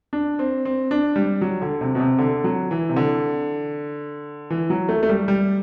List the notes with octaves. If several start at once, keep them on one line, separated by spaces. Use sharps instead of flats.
D4
C4
C4
D4
G3
F#3
D3
C3
B2
C3
D3
F#3
E3
C3
D3
E3
F#3
A3
A3
G3
G3